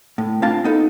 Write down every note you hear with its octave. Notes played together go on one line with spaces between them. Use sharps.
A2
C4 D4 F4 F5 A5
B3 D#4 A4